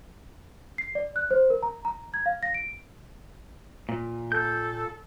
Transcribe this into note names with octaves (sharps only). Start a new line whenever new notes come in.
C7
D5
F#6
C5
A#4
A#5
A#5
G#6
F5
A#6
D7
A#2
A4 G6